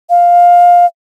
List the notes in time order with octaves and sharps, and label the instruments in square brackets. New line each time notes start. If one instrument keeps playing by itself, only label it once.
[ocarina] F5